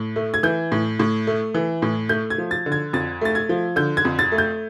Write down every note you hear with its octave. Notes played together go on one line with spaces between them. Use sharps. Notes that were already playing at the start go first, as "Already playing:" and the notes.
Already playing: A2
A3
G#6
E3 G6
A2
A2
A3
E3
A2
A3 G6
G#6
F3
A6
D3
G#6
F2 A6
A3 A6
G#6
F3
D3 G6
G#6
F2
A6
A3
G6